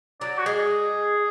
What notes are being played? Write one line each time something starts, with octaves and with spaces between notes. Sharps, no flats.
F#3 D5
F#4
G#3 G#4